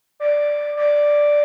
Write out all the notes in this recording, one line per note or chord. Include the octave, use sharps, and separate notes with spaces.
D5
D5